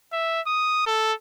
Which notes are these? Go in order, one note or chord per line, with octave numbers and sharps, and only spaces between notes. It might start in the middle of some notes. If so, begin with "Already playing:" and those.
E5
D#6
A4